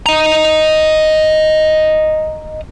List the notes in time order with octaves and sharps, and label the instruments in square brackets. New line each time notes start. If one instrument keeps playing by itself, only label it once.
[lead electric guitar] D#5 A#5